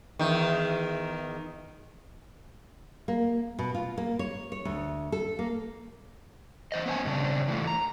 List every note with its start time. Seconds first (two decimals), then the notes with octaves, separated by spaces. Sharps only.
0.19 E2 D#3
3.08 A#3
3.59 B2
3.74 F4
3.98 A#3
4.19 C#5
4.52 C#5
4.65 D2
5.12 A4
5.39 A#3
6.72 E3 C5 D#5
6.86 B3 C#4 C5 E5 G#5 A5
7.05 G2 C#3 C4 D4
7.48 E3 A3 F4
7.67 A#5